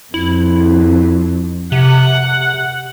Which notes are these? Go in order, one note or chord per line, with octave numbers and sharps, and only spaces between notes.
F2 E4
C3 F#5